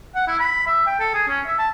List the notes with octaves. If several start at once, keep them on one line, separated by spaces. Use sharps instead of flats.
F#5
E4
B5
E5
G5
A4
G#4
C#4
E5
A5